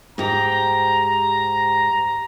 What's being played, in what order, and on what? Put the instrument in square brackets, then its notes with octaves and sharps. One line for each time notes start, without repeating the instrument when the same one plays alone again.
[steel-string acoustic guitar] G#2 G4 [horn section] A#5